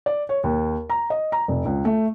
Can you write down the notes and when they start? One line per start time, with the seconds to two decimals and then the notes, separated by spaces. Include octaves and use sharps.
0.06 D5
0.29 C#5
0.44 D#2
0.90 A#5
1.10 D#5
1.32 A#5
1.48 F1
1.65 C#2
1.85 A3